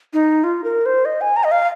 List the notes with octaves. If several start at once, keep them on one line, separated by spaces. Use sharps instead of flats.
D#4
F4
A#4
C5
D#5
G#5
A#5
D#5
F5